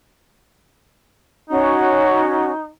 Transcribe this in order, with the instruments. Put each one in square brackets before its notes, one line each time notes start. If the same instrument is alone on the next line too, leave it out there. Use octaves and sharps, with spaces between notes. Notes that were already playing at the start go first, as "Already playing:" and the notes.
[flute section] C#4 F#4 C#5 [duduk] D#4